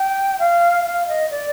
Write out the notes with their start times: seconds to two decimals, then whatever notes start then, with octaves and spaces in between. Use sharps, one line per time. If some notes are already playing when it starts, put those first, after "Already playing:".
Already playing: G5
0.39 F5
0.85 F5
1.08 D#5
1.30 D5